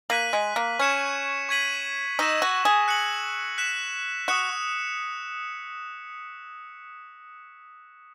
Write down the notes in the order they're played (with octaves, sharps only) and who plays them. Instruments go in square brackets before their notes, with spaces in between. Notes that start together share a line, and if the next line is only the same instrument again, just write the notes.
[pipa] A#3 [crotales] F#6 B6 D#7 F#7
[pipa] G#3
A#3
[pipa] C#4 [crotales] C#6 G#6 C#7 E7
[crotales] C#6 G#6 B6 D#7 F#7
[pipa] D#4 [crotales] C#6 E6 A#6 E7
[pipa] F#4
G#4
[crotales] F#6 C#7 F#7
F#6 B6 E7
[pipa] F#4 [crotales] D#6 F#6 C#7 E7